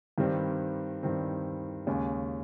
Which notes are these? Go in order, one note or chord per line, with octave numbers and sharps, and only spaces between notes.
G2 D#3 G3 C4
G2 D#3 G3 C4
D#2 C#3 G#3 C#4